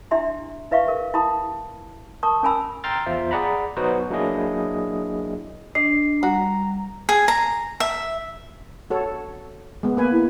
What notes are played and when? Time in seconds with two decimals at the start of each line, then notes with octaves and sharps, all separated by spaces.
0.11 D4 E4 G4 E5 A#5 C6
0.71 E4 B4 E5 F5 C#6
0.87 G#4 A#4
1.14 E4 G4 A5 B5 D#6
2.23 A#4 A5 C#6 D#6
2.43 C#4 A#4 G#5 A5 B5 E6
2.84 G5 A#5 C6 E6 F6 A6
3.06 E2 F4 C5 E5
3.31 G#4 D5 F#5 A#5 B5
3.77 F#3 B3 D#4 F#4 B4 C5
4.10 F#3 A#3 D4 E4 G#4 D#5
5.75 D4 D#5 C7
6.23 G3 F#4 A#5
7.09 G#4
7.28 A#5
7.80 E5
8.90 F#4 A4 C#5
9.83 G#3 B3
9.97 A#3 B4 G#5
10.12 E4